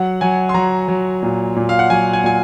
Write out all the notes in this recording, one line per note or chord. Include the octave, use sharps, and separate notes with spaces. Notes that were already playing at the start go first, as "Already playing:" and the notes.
Already playing: F#3 F#5
F#3 G#5
C6
F#3 A#5
F#3
A#2
A#2
F5
F#5
F#3 G#5
G#5
A#2 G#5